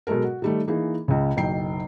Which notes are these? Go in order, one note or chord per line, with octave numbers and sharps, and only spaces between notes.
B2 F#3 G#3 A4 A#4
F#4
D#3 G3 A3
E3 A#3 D#4 G#4
C#2 C#3
F#1 B1 G5 C7